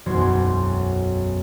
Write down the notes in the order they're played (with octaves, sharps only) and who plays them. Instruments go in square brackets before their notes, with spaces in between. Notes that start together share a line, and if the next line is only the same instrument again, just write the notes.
[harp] E1 B1 F#2 F#3 F#4 C5